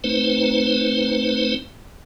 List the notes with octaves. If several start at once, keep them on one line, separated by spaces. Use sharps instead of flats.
A3 C4 D#4 B4 C5